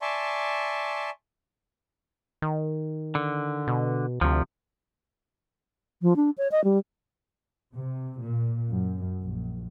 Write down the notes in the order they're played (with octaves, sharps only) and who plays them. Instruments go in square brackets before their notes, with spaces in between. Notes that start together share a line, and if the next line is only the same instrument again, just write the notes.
[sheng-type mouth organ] D5 E5 G#5 A5 C6 C#6
[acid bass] D#3
[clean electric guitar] D3
[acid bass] B2
[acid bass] D2 [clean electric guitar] C3 F3
[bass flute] F3
D4
C#5
D#5
G3
[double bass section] C3
A#2
F#2
A#1